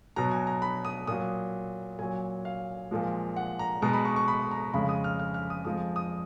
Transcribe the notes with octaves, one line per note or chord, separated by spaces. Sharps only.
B2 F#3 A#5
G#5
A#5
B5
D#6
A#2 F#3 D#6
A#2 F#3 G#5
F5
A#2 F3 G#3
F#5
A#5
B2 G#3 A#5
B5
C#6
C#6
B5
A#5
F2 C#3 G#3 B5
D#6
F6
F6
F6
D#6
F2 F3 G#3 D#6
D#6